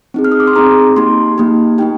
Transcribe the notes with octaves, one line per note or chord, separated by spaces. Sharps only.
C4 D#4 G#4
F6
D#6
D6
C6
C4 D#4 G#4 A#5
A#3 D#4 G4 C6
A#3 D#4 G4
A#3 D#4 G4 G5